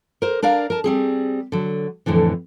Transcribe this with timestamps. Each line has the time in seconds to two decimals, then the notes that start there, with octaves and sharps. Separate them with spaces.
0.22 A#4 C5
0.42 D4 A#4 D5 F5 A#5
0.70 A#4 A5
0.84 G3 C4 G#4
1.52 D3 F#3
2.06 F2 A2 D3 E3